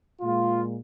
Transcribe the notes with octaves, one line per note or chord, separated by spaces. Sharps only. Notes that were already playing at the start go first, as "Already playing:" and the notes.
A#2 G#3 F4